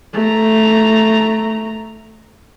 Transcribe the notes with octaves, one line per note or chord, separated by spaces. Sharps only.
A3 A#5